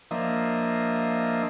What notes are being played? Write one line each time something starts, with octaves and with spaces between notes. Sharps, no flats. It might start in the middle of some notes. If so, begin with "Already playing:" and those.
F3 A#3 D4 D#5 E5